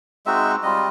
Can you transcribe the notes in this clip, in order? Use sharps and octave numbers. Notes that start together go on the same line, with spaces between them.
G#3 C4 D#4 F#4 E5
G3 C4 F4 D#5